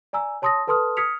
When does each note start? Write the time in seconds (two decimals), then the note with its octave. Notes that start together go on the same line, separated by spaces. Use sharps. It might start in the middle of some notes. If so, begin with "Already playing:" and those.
0.13 D5 G#5 A#5 E6
0.42 C#5 A5 C6 D#6 E6 A#6
0.67 A4 B4 A5 C6 D#6 F6
0.97 D#6 F6 G#6 B6 C#7 F7